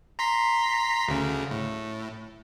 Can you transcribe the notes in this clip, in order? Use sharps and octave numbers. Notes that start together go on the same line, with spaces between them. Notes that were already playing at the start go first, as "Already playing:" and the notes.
A#5 C6 B6
D2 C#3
A2